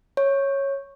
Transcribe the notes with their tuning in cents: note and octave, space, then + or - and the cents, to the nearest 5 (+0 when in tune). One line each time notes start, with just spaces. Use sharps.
C#5 -10